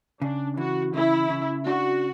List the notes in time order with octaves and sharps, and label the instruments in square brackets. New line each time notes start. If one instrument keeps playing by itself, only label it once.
[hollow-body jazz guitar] C#3 [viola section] D4
[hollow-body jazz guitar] E3 [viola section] F#4
[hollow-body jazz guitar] C#3 [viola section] E4
[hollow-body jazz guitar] C#3
[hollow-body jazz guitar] D4 [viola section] F#4